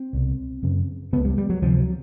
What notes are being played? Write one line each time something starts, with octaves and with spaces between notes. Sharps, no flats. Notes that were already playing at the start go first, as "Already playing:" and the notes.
Already playing: C4
C2 B2
F#2 C#3
C#2 C#3 B3
G3
G3
F#3
D2 C3 F3
F#3